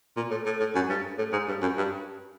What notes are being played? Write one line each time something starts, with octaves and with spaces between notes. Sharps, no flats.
A#2
A2
A2
A2
F#2
G2
A2
G#2
G2
F#2
G2